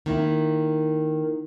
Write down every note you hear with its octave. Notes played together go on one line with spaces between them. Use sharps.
D#3 A#3 E4